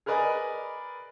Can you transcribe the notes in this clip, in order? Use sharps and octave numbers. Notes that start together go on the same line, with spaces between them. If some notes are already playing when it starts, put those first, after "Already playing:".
G#4 A#4 B4 D5 D#5 G#5